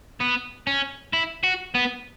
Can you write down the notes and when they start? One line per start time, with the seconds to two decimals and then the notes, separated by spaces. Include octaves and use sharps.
0.21 B3
0.67 C#4
1.13 E4
1.44 F#4
1.75 B3